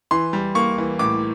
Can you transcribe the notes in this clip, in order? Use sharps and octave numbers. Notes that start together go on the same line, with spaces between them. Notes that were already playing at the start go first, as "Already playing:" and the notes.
E3 C6
G3
A#3 C#6
E3
A2 D6